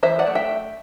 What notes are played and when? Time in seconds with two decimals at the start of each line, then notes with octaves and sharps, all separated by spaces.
0.03 E3 C5 E5
0.19 D5 F#5
0.27 A3
0.35 E5 G5